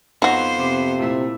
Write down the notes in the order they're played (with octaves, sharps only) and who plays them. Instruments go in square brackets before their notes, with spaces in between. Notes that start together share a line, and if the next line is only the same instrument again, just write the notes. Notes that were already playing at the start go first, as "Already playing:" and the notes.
[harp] F2 F5 [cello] B3 C5 [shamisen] D#4 F#4
[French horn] C3 [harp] D6
[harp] A#2 E4 [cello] A3